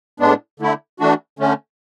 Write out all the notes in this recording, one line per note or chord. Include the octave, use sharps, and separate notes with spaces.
A2 G#3 B3 D4
D3 A3 E4
E3 A3 D4 F#4
D3 A3 C#4